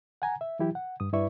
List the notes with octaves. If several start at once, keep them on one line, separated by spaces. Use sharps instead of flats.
F#5 G#5 A#5
E5
E3 F#3 E4 G4
F#5
G2 D#6
G2 E4 B4 D5 E5 C#6